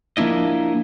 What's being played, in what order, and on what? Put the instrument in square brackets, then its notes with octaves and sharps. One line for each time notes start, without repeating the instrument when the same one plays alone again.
[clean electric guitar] F3 A#3 D4 E4 D#5